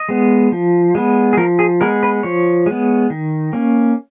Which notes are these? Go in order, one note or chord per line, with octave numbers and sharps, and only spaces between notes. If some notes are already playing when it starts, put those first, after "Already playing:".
Already playing: D#5
G#3 B3
F3
G#3 B3
G#4
F3 A#4
G#4
G#3 B3 A#4
B4
F3 C#5
G#3 B3
D#3
A#3 C#4